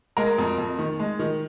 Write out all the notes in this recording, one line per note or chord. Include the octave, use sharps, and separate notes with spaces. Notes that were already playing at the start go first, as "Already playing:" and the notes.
G#3 A#4
F2
F2
D#3
G#3
D#3